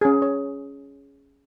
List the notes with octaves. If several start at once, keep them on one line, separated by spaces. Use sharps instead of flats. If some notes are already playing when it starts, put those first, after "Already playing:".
C#4 G#4
C#5